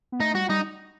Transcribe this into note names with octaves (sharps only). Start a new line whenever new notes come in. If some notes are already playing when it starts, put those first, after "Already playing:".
B3
A3 D#4
G3 F#4
G3 D#4